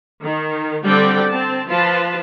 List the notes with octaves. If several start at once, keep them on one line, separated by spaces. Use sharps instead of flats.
D#3
D3 G3 C4 D5 F#5 G5
C4 A5
F3 F4 B4 A5